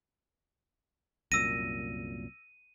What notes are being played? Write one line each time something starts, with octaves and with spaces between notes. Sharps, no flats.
C2 F#2 A#2 E6 A#6 D#7